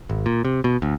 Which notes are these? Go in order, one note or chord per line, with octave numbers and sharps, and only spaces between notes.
G#1
A#2
C3
B2
D2